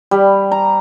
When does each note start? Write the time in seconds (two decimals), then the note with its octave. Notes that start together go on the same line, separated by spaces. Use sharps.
0.11 G3
0.52 A#5